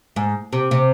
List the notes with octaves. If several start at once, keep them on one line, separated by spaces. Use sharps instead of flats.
G#2
C3
C3